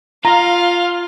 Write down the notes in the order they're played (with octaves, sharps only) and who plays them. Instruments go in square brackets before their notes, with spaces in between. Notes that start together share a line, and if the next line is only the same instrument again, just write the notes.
[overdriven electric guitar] F4 [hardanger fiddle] F5 [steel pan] A#5